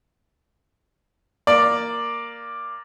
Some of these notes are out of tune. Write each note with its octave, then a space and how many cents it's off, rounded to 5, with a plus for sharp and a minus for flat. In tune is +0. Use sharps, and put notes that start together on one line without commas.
A#3 +0 D5 +5